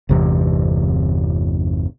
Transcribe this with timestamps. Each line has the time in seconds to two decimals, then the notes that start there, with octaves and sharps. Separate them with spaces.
0.09 G1 E2 C3 E3